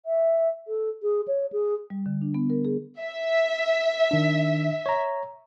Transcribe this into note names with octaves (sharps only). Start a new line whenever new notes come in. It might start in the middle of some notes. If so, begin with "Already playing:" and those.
E5
A4
G#4
C#5
G#4
G3
D3
D4
B3
A#4
G#4
E5
D#3 D4
C#5 A#5